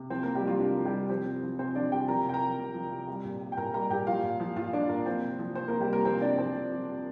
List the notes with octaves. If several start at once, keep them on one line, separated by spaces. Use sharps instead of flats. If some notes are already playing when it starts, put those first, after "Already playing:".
Already playing: C3
F3 C4 C5
A#3 A#4
C3
G3 G4
F3 F4
C3 D4
F3
G3 G4
C3
F3 C4 C5
C3
F3
C3 C4 C5
F3 D4 D5
C3 G4 G5
F3 A#4 A#5
C3 G5
A#4 A#5
F3
C3
F3
C3
G3
A#2
G3
G5
A#2 A#4 A#5
G3 A#4 A#5
A#2 G4 G5
F3 F4 F5
A#2
F3
A#2 F4 F5
F3 D4 D5
A#2 A#3 A#4
F3 C4 C5
C3
F3
C3 C4 C5
A#3 A#4
F3
G3 G4
C3 A#3 A#4
F3 C4 C5
C3 D4 D5
F3 C4 C5
C3
F3
C3